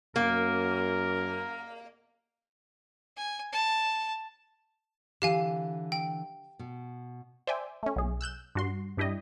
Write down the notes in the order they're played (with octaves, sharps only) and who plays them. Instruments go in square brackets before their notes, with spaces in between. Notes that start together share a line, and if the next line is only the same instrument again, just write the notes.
[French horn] F#2 [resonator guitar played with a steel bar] A#3 [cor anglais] A#4
[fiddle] G#5
A5
[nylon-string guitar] D3 E3 [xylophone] G4 F5 G#5
[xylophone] G5
[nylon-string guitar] B2
[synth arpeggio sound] C5 D5 E5 G5 G#5
A3 C#4
B1 G#4
E6 F#6 G6 E7
G2 F#4 C6
G2 D4 E4 G4 D#5